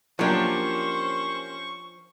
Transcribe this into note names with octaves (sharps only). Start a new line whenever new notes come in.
F3 F#3 A#3 C#4 D4 G4 C5 C#6